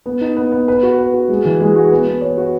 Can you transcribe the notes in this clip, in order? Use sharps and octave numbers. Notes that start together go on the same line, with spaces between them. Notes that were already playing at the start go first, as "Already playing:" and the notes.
B3
D#4
B3
B3
B4
F#4
B4
F#4
G#3
E3
G#3
F#4
B3
B3
C#5
F#4